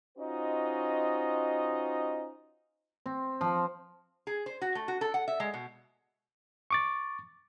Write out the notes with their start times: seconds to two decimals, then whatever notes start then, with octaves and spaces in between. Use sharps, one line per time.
0.18 C#4 D#4 F4 F#4 C5 D#5
3.06 C4
3.41 F3
4.27 G#4
4.46 C5
4.61 F#4
4.75 A3
4.88 F#4
5.01 A4
5.14 F#5
5.28 E5
5.40 G#3
5.54 B2
6.71 C#6 D6 A6